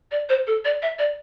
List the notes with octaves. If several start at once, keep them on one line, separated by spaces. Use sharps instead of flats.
D5
C5
A4
D5
E5
D5